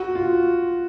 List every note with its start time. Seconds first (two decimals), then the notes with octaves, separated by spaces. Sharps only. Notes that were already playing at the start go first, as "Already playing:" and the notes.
Already playing: F#4
0.15 F4